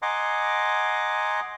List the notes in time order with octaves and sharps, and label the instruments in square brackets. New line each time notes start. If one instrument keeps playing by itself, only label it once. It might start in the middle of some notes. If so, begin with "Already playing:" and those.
[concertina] D#5 F#5 G#5 A#5 C6 D6